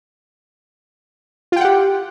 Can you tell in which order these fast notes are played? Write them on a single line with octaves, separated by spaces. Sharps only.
F4 G5 F#5 G4